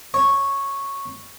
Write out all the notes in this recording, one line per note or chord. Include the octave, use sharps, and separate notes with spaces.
C#5